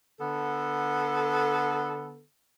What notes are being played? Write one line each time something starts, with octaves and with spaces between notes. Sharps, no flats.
D3 B3 A4